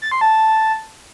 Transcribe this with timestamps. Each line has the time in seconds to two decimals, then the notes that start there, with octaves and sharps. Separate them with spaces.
0.02 A6
0.11 C6
0.21 A5